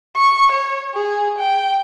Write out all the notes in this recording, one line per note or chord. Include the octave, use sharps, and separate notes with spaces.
C#6
C#5
G#4
G5